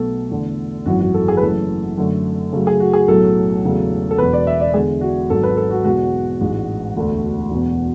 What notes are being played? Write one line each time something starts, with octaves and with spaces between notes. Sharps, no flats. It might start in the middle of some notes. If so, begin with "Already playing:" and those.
Already playing: B1 B2 A3 A4
E2 D3 A3
G#1 F#2 E3 F#4
F#4
A4
G#4
B4
F#1 F#2 E3 A3 A4
F#2 D3 A3
F#2 C#3 F#3 A3
G#4
F#4
G#4
B1 A2 F#3 A3 A4
E1 E2 C#3 F#3 A3
A4
E1 E2 B2 B4
D5
E5
D5
E2 D3 G#3 G#4
F#4
G#1 G#2 F#3 A4
B4
A4
F#4
E2 B2 G#3 F#4
A1 G#2 G#3
E1 D2 D3 A3
E1 E2 B2